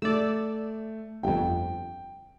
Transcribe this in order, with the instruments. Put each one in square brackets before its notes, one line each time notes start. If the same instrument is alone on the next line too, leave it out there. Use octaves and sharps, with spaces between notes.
[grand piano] A3 [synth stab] D5 E6
[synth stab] G1 F2 [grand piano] G5